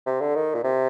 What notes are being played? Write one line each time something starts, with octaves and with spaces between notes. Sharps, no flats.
C3
D3
D#3
A#2
C3